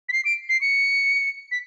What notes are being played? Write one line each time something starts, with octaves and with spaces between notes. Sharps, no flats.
B6
C7
D7
C7
C#7
B6